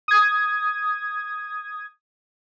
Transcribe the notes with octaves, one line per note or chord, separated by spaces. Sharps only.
D#6 G#6